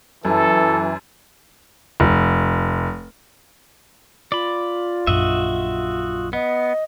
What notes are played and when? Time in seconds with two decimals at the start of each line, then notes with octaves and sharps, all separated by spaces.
0.25 F#2 E3 A4
2.00 F1
4.32 F4 D5 B5
5.07 A#1 F#2 F#4 D#5 E5
6.33 B3 D#5